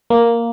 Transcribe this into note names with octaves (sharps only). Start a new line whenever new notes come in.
A#3